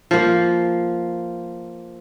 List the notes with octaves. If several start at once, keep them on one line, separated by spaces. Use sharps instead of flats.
F3 A#3